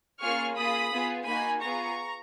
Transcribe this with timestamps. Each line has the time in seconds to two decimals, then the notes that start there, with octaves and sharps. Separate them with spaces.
0.21 A#3 C#4 F4 G#4 C#6 F6
0.56 A#3 F4 G#4 B5 D#6
0.92 B3 F4 G#4
1.26 A#3 D#4 F#4 G#5 B5
1.61 B3 F4 G#4 A#5 C#6